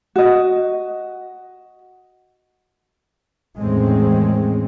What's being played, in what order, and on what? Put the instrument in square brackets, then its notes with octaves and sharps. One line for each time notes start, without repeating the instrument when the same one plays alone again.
[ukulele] F#4 D#5
[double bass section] E2 A2 D#3 G#3 C4 C#4